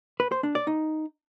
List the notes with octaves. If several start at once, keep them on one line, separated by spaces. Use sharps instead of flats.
B4
C5
D4
D5
D#4